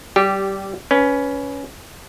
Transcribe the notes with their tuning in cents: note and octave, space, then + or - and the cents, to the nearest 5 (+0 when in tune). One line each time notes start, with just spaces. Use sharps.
G3 -20 G4 +0
C#4 +15 B4 +0